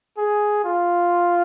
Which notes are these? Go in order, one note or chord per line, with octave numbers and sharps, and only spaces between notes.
G#4
F4